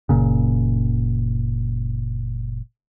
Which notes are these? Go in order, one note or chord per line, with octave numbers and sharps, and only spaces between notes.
F#1 A#2 C#3